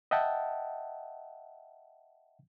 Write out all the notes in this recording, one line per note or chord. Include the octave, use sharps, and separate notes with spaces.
D#5 E5 F#5 G5 A5